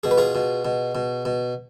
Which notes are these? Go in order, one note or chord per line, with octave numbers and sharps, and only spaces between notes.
B2 G#4
B4
F4 G#4
B2
B2
B2
B2